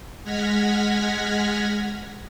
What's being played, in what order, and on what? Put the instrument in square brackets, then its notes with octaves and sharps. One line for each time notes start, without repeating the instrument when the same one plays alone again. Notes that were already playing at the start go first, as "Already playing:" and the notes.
[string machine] G#3 F#5 F6 G#6 A#6 B6